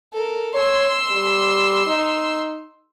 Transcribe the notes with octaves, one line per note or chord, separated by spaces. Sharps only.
A4 A#4
C#5 C6 E6
G3
D#4